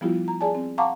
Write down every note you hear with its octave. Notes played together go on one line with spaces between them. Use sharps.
F3 G3 B3 E4 F4 G4
A#5
G#4 D5 G#5 A5
C4
F5 F#5 A5 A#5 C#6 D6